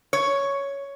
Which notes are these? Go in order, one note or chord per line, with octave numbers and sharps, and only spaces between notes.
C#5